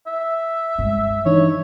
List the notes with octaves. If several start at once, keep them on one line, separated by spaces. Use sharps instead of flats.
E5
G2 G#3
E3 D4 D#4 C#5